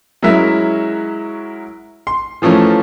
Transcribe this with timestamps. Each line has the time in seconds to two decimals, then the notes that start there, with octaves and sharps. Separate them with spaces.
0.23 F#3 G#3 C#4 E4 A#4 E5
2.07 C6
2.42 E3 F3 A3 C#4 A#4